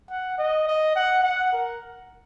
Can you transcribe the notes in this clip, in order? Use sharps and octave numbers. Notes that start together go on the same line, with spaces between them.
F#5
D#5
D#5
F#5
F#5
A#4